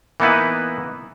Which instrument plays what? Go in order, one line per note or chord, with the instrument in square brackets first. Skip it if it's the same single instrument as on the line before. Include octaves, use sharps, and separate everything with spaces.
[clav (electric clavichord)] E3 A#3 B3 D#4 E4 B4